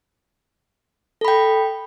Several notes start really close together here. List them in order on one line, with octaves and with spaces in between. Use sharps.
A4 B5 G5